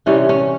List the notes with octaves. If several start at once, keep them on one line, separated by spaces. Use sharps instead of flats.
C3 E3 G3 C#4
C#4